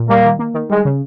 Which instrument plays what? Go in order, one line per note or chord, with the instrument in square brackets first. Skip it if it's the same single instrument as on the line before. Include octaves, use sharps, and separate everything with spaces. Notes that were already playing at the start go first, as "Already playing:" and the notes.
Already playing: [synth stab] A#2
[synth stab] G3 [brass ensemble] A#3
[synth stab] D#3
A#3
D#3
[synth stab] G3 [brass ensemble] G#3
[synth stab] C#3